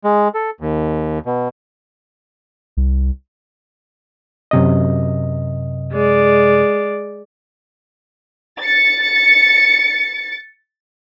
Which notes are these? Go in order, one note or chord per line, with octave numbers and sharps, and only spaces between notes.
G#3
A4
D#2
B2
C2
F#2 C3 D#5
G#3 D5
A6 C#7